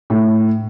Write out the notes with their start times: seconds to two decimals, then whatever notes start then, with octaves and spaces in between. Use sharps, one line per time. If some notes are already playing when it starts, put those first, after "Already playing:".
0.10 A2